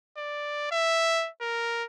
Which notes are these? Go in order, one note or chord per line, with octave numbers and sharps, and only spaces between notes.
D5
E5
A#4